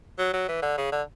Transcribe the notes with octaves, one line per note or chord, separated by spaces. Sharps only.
F#3
F#3
E3
D3
C#3
D3